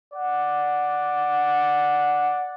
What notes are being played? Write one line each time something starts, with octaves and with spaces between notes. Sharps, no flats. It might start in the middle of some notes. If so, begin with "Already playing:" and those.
D5 F#5